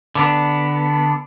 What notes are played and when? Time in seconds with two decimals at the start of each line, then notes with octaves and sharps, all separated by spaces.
0.15 D3 B3 D4